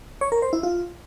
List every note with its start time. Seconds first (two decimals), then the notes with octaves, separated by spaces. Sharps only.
0.21 C#5
0.32 A#4
0.42 C5
0.53 E4
0.63 F4